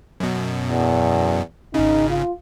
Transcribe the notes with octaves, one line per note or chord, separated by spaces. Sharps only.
F#2 B2
E2
G#1 C#3 D#4
F4